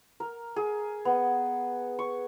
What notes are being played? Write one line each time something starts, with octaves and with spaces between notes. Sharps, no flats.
A#4
G#4
B3
C#6